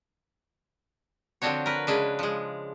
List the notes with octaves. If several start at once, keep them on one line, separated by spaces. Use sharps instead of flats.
D3 F3 C4 D4 F#4 C#5
A#4 B4
C#3 G#3 D4 B4
F3 G#3